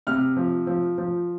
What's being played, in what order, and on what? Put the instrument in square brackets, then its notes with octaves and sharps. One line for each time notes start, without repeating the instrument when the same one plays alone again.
[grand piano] C3 F6
F3
F3
F3